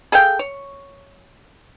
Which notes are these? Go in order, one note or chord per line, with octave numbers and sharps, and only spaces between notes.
G#4 A4 F5 G5
C#5